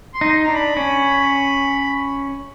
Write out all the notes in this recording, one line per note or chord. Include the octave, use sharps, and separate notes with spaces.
C6
D#4
D4 A#5
B5
C#4